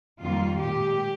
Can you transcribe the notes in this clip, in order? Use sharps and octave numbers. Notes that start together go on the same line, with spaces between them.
F2 D#3 G3 A#3 F4
A#2 G#3 G4